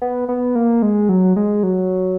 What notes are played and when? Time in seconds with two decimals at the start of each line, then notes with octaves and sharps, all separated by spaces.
0.02 B3
0.29 B3
0.55 A#3
0.82 G#3
1.09 F#3
1.36 G#3
1.63 F#3